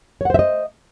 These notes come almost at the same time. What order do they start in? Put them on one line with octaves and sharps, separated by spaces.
C#5 F#5 C5 E5 D#5